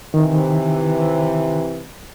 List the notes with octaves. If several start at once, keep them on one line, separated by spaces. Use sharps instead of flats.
C3 D#3 E3